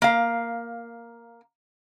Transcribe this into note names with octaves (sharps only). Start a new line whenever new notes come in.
A#3 F5